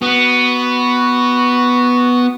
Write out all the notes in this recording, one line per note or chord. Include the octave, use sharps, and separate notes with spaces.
B3 F#4